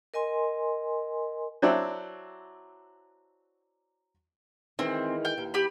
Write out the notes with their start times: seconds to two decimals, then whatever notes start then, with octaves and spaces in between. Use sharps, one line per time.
0.14 A#4 D#5 G#5 C6
1.62 F#3 C4 D4 E4
4.79 D#3 E3 G#3 C4
5.25 G5 F6
5.38 D#2
5.54 G4 B5